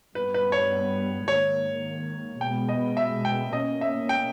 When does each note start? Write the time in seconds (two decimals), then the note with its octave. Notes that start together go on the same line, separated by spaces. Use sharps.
0.15 G2 G3 B3 B4
0.34 B4
0.52 C#5
1.28 G#2 D#3 A#3 C#5
2.40 B2 G#3 B3 G5
2.69 D#5
2.97 E5
3.25 G5
3.53 B2 A#3 C#4 D#5
3.81 E5
4.09 G5